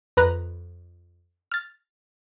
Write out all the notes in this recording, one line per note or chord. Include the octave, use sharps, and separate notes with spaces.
F2 B4 A#5 F#6
F6 A6